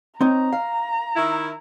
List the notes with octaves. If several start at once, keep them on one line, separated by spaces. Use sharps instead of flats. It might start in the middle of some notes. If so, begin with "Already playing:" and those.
C4 D#4 C#5 A#5
F5
D#3 E4